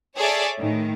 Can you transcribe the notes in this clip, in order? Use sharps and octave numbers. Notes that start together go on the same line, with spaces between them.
G#4 A4 C#5 D5 E5
A2 D#3